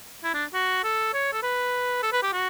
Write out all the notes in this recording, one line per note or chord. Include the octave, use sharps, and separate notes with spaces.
E4
D4
F#4
A4
C#5
A4
B4
A4
B4
G4
F#4